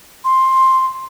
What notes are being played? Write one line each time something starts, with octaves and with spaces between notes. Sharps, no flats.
C6